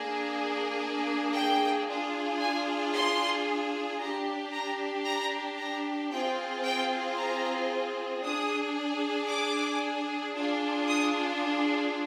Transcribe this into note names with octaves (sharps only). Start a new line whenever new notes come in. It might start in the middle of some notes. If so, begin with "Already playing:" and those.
Already playing: A#3 D4 G#4
G5
D4 F4 G#4
G#5
C6
D4 G4 A#5
A#5
A#5
A#5
C4 F4 G#4 G5
G5
A#5
D4 G#4 D#6
D6
D4 F4 G#4
D#6